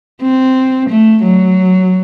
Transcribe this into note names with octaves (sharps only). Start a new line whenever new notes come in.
C4
A3
F#3